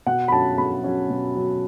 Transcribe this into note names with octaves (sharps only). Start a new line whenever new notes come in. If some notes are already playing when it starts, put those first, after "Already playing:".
B2 F#5
B5
F#3 C#4 A5
B2 B5
F#3 C#4
B2
F#3 C#4